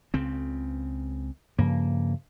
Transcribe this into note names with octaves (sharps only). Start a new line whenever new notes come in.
C#2 C#3 C4
G2 C#3 F3 A#3